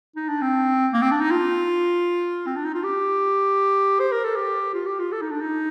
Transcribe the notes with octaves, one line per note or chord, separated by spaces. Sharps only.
D#4
D4
C4
A#3
C4
D4
D#4
F4
C4
D4
D#4
F4
G4
C5
A#4
A4
G4
F4
G4
F4
A4
D#4
D4
D#4